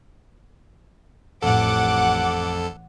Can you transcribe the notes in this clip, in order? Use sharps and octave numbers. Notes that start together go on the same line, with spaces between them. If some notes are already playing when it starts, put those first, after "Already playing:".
A1 F2 A4 F#5 D6